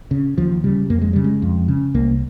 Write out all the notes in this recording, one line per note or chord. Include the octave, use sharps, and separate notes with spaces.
C#3
D#2 F3
C#3 G3
F2 A#3
G#3
C#3 G3
G#3
F2
C#3
C2 A#3